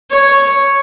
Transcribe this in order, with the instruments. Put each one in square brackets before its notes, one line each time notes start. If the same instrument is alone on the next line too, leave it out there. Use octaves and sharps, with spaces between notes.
[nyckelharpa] C#5